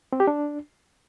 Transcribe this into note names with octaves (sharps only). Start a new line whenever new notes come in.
C4
G4
D4